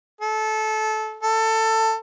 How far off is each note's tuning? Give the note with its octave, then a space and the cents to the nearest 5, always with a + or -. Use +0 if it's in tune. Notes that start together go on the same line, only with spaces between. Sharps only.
A4 -20
A4 +20